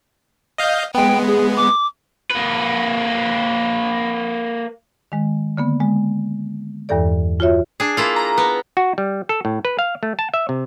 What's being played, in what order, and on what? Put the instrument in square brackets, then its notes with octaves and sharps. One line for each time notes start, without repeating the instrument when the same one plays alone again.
[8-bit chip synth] D#5 F5 G6
[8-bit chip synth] G#3 B3 [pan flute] G5
[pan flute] G#4
D6
[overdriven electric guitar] A#3 B4
[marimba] D#3 G#3
D3 A#3 B3
G#3
E2 G2 E3 A4 D5
F4 F#4 C#5 E5
[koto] D4 G#4
A#3 E4 F4
[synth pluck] A#5
[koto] B3
[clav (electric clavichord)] F#4
G3
A4
A2
B4
F5
A3
A5
E5
C3